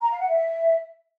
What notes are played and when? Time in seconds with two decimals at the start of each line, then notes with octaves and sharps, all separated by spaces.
0.01 A#5
0.10 F5
0.19 F#5
0.28 E5